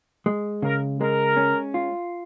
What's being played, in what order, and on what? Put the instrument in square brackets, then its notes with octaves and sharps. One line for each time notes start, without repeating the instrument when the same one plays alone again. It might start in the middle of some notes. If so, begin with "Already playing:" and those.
[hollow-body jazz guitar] G#3
[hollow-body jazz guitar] C#3 [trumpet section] A#4
[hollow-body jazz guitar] G#3 [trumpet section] A#4
[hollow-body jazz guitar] C#4
F4